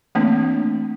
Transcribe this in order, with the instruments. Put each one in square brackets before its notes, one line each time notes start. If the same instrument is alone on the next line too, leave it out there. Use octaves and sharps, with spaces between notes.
[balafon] E3 A3 A#3 C4 D4